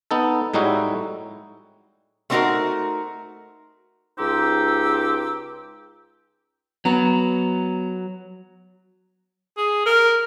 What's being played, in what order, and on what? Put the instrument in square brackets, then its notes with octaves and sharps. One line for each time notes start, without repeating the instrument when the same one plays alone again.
[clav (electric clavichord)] B3 D#4 A4
A2 G3 G#3 D#4 E4 F#4
[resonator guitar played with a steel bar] A3 B3 C4 D#4 F#4 A#4
[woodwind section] C#2 D#4 G4 C5 E6
[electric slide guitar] F#3 [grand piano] B3 A#5
[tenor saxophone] G#4
A#4